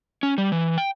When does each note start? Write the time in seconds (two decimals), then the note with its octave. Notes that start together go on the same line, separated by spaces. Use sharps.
0.23 C#4
0.38 G3
0.52 E3
0.78 G5